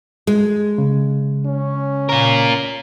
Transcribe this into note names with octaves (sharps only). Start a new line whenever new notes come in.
G#3
C#3
C#4
F4 A#4